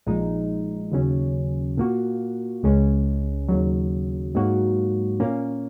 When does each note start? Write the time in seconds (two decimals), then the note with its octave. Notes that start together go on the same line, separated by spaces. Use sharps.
0.06 A#1 A#2 G#3 D#4
0.92 D#2 C#3 F#3 C#4
1.77 A#2 A#3 F#4
2.63 C#2 C#3 G#3 C#4
3.49 D#2 C#3 F#3
4.35 G#2 F#3 A#3 F#4
5.20 A#2 A#3 C#4